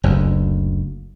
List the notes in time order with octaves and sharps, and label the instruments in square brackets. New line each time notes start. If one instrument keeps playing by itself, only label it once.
[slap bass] F#1 D2